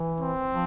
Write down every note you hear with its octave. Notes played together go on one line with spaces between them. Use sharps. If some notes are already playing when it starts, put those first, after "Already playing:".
Already playing: E3
C4
F3